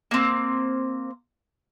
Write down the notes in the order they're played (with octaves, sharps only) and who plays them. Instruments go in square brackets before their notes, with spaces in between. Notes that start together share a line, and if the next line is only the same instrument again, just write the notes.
[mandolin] A#3 C4